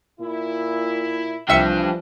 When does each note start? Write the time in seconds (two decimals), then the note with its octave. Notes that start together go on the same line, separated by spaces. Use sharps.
0.20 A#2 E4
1.49 C2 E3 F3 G3 D4 E5 G5 C#7